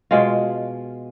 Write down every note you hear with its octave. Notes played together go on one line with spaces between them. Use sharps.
B2 G#3 F4